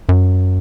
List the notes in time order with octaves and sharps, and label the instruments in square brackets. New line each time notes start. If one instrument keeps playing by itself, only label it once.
[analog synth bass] F#2